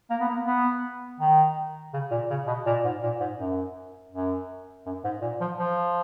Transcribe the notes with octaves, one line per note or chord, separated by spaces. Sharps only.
A#3
B3
A#3
B3
D#3
C#3
A#2
C#3
B2
A#2
G#2
A#2
G#2
F#2
F#2
F#2
G#2
A#2
F3
F3